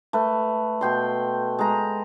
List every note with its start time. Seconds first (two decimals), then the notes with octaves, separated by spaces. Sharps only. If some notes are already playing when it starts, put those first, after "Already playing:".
0.13 A3 B4
0.81 B2 G5 C6
1.59 G#3 A#5